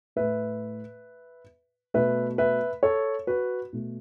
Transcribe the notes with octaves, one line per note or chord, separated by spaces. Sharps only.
A2 A3 B4 E5
B2 A3 B4 E5
B4 E5
A4 C#5
F#4 B4
B2 A3